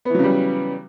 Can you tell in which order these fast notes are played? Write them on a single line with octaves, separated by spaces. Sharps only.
B3 E3 F#3 C#3 G3